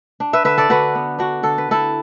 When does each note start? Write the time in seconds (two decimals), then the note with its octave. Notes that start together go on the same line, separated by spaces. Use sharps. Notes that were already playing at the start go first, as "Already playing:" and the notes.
0.20 D4
0.33 B4 E5
0.45 D3 B4 E5
0.58 A4 D5
0.69 D3 F#4 B4
0.95 B3
1.19 D4 F#4
1.43 D3 A4
1.58 B4
1.69 D3 E4 A4